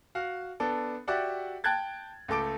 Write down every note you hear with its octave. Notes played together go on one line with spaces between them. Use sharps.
F#4 F5
B3 D4 A4
F#4 G4 D5 E5 F#5
G5 A5 F#6 G#6 A6
C#2 A3 A4 D6 D7